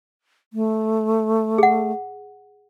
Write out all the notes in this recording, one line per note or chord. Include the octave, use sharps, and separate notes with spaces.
A3
G#4 F#5